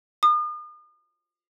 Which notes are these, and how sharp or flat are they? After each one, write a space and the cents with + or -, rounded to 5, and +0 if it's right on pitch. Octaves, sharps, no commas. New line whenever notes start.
D#6 -40